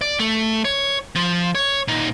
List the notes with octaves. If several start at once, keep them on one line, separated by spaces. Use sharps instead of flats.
D5
A3
C#5
F3
C#5
A#2 D#4